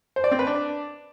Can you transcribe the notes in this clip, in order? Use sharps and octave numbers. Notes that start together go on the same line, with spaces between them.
C5
D5
C4
B4
D4